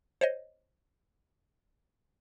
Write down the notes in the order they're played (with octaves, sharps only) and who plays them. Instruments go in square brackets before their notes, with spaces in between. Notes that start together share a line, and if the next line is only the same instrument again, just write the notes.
[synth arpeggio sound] C5 C#5 D#5